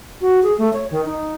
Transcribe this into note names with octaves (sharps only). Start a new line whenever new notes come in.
F#4
G#4
A3
C#5
D#3
D#4